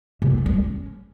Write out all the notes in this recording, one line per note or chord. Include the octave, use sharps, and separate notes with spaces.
C3
B3
A3
G3
C#4